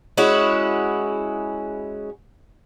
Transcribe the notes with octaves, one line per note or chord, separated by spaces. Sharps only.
G#3 C#4 E4 F#4